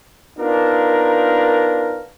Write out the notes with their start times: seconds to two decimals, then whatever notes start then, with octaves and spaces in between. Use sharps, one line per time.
0.39 B3 D4 D#4 F4 A#4